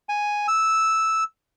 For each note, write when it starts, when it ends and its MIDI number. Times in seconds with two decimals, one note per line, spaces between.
0.09 0.47 80
0.48 1.24 88